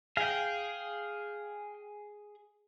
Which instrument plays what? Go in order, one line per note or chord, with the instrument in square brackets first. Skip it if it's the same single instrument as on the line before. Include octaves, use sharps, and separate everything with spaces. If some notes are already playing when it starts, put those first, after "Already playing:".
[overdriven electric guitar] G#4 [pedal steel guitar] F5 G5